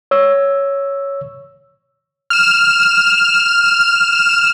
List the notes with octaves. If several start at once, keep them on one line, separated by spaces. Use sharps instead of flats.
C#5 E6
F6 E7